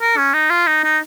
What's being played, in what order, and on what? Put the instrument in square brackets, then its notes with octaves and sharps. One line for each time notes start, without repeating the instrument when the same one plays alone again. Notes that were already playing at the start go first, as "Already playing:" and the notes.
[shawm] A#4
C#4
D#4
F4
D#4
D#4